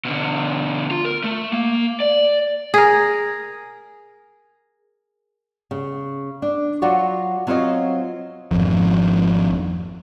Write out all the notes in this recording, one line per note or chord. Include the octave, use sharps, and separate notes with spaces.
B2 D3
F4
A#4
A3
A#3
D5
G#4 A#4
C#3
D4
F#3 F4 F#4 C#5 D5
F#3 C4 F4 C5 C#5 D#5
G#1 F2